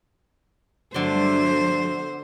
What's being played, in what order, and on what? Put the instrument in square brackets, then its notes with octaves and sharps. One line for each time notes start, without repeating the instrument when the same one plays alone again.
[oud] G2 F#4 [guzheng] D3 D5 C6 [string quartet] F#3 A3 [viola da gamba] C5